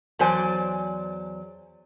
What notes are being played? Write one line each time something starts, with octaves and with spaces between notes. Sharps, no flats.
E2 F#3 C5 D5 G#5